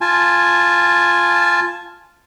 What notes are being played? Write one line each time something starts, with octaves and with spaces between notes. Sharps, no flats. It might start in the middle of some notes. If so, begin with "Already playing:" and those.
F4 G#5 A5